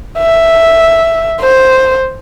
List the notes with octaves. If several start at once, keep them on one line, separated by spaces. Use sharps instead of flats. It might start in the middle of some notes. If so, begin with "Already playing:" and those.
E5
C5